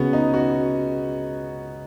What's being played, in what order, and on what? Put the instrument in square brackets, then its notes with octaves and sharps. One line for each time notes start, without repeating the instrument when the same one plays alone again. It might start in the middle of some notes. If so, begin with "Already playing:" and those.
Already playing: [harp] C#2 C#3 G#3 [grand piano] B3 C#4 F#4
[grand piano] D#4
F#4